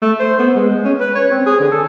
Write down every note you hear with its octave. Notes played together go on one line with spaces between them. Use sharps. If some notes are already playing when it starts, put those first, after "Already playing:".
A3
C5
B3
G#3
G#3
C#4
B4
C#5
C4
G#4
D3
A4